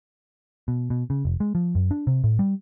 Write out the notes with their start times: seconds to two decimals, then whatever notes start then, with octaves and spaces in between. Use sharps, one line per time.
0.68 B2
0.90 B2
1.10 C#3
1.25 F1
1.40 G#3
1.55 F3
1.75 F#2
1.91 D4
2.07 C3
2.24 A2
2.39 G3